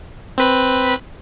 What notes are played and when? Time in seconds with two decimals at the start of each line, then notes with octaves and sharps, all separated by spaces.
0.38 C4 B4 B5